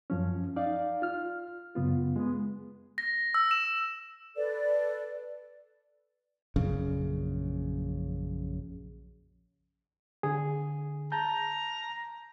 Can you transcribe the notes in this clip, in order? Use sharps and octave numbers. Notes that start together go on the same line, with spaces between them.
F#2 F3 C#4
D#4 D5 F5
F4 F6
F#2 C#3 B3 F4
G#3 B3
A#6
E6
E7
A4 B4 D5
A#1 F#2 C#3
D3 G#4
A5 A#5 G6